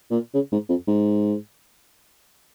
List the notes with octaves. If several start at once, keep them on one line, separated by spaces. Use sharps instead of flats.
A#2
C#3
G#2
F2
G#2